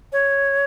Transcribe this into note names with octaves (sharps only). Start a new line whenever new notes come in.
C#5